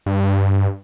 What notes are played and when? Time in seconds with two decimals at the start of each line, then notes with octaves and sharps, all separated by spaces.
0.06 G2